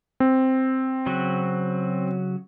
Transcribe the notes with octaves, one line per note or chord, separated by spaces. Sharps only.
C4
C#3 F#3 F#4